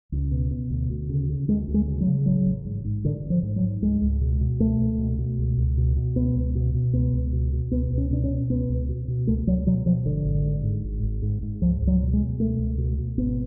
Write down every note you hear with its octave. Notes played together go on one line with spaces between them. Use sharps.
C#2
B2
B2
D2
D2
C#3
C#3
D2 G#3
D2
G#3
C#3
F#3
C#3
A1 F#3
A1
G#2
G#2
A1 D3
A1
F3
G#2
F#3
G#2
C#2 G#3
C#2
B2
B2
C#2 A3
C#2
B2
B2
C#2
C#2
B2
B2
C#2 B3
C#2
B2
B2
C#2 B3
C#2
B2
B2
C#2 B3
C#2
C#4
B2 D4
C#4
B2
C#2 B3
C#2
B2
B2
C#2 A3
C#2 F#3
B2 F#3
B2 F3
G#1 D3
G#1
G#2
G#2
G#1
G#1
G#2
G#2
C#2 F3
C#2
F#3
B2
G#3
B2
C#2 A3
C#2
B2
B2
G#1 B3